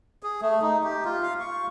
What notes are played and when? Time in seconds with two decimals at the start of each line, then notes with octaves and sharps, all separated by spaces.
0.23 G#4
0.42 A3
0.62 D#4
0.84 G4
1.05 F4
1.22 F5
1.40 C#6